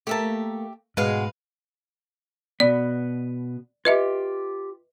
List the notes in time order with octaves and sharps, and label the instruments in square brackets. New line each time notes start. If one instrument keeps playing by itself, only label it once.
[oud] A3 A#3 [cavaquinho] G4 E5 A5
[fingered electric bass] G#2 [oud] B2 G#3 [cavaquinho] B4 F5
[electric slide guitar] B2 B3 [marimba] D5
[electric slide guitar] F4 G4 [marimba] B4 D#5 E5